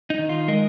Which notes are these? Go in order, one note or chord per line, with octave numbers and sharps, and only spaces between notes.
D#4
D#3
F4
G#3 A#4 D#5